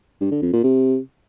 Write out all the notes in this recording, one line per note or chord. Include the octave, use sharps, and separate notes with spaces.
G2
D3
F2
A#2
C3